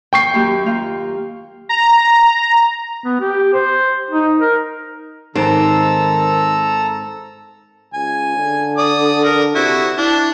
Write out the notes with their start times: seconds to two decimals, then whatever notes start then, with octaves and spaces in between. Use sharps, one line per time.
0.13 D#2 G5 C#6 C7
0.33 F#2 A#3 G4
0.66 A#3 F4 F5
1.69 A#5
3.05 B3
3.21 G4
3.54 C5
4.11 D#4
4.40 A#4
5.35 G#2 D#3 C4 A4 C5 A#5 E6
7.94 C#2 G#5
8.37 D3
8.78 D5 D#6
9.24 A#4
9.55 C3 E4 F#4
9.98 D4 E4